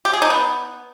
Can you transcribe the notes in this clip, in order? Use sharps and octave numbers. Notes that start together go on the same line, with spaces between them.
G4
G#4
D#4
B3